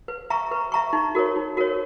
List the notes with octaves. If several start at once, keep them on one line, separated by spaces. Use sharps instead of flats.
B4
E5 A#5 C#6
B4
E5 A#5 C#6
D#4
F#4 A#4 C#5
D#4
F#4 A#4 C#5